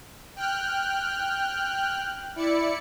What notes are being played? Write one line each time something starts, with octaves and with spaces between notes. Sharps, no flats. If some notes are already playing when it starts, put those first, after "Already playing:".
G5 F6 F#6
E4 D5 C#7